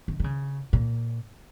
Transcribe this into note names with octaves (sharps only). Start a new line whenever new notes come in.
D#3
D#3
C#3
A#2